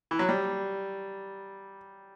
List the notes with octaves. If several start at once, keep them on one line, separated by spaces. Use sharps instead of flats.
E3
F#3
G3